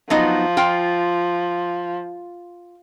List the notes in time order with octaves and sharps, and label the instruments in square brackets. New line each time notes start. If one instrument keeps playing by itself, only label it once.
[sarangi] F3 [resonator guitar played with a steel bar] F#3 B3 D#4
[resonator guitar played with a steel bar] F4 G5